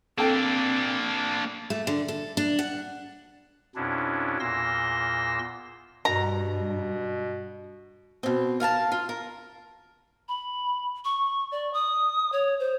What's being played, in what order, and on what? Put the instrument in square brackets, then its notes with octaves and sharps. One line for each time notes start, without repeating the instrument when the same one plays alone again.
[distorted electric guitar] A#3 D4 [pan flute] C4 [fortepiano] A4 G5
[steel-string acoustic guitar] A3
D3
A4
D4
F#5
[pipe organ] F2 B2 C#4 D4 E4
E2 A#2 C6 E6 A#6
[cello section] G2 [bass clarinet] B2 [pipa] A#5
[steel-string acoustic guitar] B2 C4
A#4 F5 G#5 A5
F4
A#4
[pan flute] B5
C#6
D5
D#6
C#5
C5